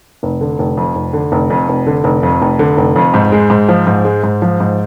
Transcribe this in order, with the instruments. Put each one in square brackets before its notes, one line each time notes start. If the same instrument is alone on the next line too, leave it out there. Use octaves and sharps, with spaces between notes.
[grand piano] F1
D3
F1
F2
F1
D3
F1
F2
F1
D3
F1
F2
F1
D3
F1
F2
G#2
G#3
G#2
F3
G#2
G#3
G#2
F3
G#2